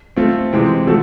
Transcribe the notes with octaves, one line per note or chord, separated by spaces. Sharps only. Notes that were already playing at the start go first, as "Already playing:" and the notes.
A3 C4 F4
C3 E3 G#3 C4
F3 A3 F#4 A4